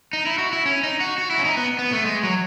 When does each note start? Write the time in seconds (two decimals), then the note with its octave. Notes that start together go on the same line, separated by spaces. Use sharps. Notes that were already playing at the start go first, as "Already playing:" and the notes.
0.13 D#4
0.26 E4
0.38 F#4
0.53 E4
0.66 C#4
0.83 D#4
1.00 F#4
1.18 F#4
1.30 E4
1.38 C#4
1.45 D#4
1.57 B3
1.79 B3
1.92 A3
2.05 G#3
2.23 F#3